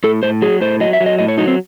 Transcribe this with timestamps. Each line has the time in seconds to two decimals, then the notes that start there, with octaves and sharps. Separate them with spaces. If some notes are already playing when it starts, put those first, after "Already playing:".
0.04 A2 A4
0.23 A2 C5
0.42 F#3 G#4
0.61 A2 C5
0.80 F#3 D#5
0.93 E5
1.00 F#3
1.06 D#5
1.19 A2 D#5
1.28 C#5
1.38 F#3 D#4
1.48 C4